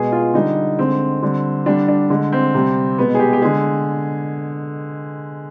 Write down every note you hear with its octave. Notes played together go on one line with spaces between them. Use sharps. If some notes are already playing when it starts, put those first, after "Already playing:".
Already playing: B2 G#3 G#4
F4
D3 G3 D#4
D3 G#3 C4
D3 G3
D3 G3 D4
D4
D3 G#3
C4
C3 G3
B2 G#3 B3
G#4
G4
G4
D3 G#3 G#4